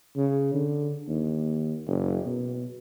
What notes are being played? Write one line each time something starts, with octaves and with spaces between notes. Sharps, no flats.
C#3
D3
D#2
F#1
B2